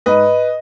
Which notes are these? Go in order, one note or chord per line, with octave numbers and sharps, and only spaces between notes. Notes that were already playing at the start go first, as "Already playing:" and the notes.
G#2 B4 D#5